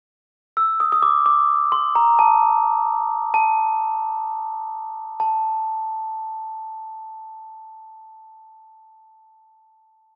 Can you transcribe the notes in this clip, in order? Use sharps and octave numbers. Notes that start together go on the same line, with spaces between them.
E6
D#6
D#6
D6
D6
C6
A#5
A5
A5
A5